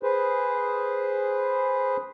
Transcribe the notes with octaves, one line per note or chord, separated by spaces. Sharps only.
G#4 B4 C5